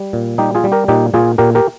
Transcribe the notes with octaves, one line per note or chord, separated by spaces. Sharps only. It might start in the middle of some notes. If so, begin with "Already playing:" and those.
Already playing: G3
A#2
G3 D#4 G4
F4 G#4
G3
G4 A#4
A#2 D#4 G4
A#2 F4 G#4
A#2 G4 A#4
G4 A#4